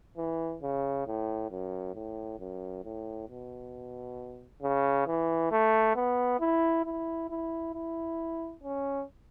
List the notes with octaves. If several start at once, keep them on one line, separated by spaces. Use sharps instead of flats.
E3
C#3
A2
F#2
A2
F#2
A2
B2
C#3
E3
A3
B3
E4
E4
E4
E4
C#4